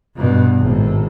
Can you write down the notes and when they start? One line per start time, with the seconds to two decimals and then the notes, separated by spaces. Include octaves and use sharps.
0.15 G2 B2
0.58 G#1 A2